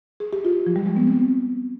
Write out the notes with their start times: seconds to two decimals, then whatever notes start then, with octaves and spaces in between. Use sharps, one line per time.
0.20 G#4
0.33 G4
0.45 F4
0.66 F3
0.76 G3
0.86 G#3
0.97 B3
1.07 C4